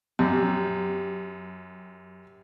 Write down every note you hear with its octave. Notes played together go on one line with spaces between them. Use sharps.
F#2 G4